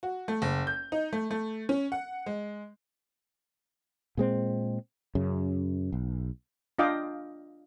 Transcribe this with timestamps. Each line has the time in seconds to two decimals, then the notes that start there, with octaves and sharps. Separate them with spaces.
0.03 F#4
0.28 A3
0.42 F#1
0.67 G6
0.92 D#4
1.13 A3
1.31 A3
1.69 C#4
1.92 F#5
2.26 G#3
4.17 A#2 G#3 C4
5.15 F#2 C#3
5.92 B1
6.79 D4 F4 D#5 F5 G5 D6